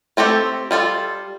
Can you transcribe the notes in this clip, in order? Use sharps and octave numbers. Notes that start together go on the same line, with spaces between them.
A3 C4 G4 A4
G3 F4 A4